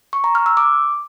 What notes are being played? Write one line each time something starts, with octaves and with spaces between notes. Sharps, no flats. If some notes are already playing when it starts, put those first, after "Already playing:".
C#6
A#5
F6
E6
D6